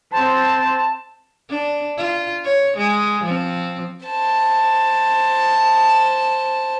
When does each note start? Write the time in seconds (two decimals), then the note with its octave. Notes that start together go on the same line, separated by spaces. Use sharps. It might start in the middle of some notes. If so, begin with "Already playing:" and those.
0.12 C4 C5 A5
1.49 D4
1.97 F4
2.44 C#5
2.77 G#3
3.24 F3 C4
4.06 C5 A5